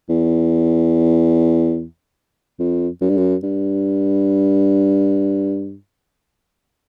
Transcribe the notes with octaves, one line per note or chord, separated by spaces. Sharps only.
E2
F2
F#2
G2
F#2
G2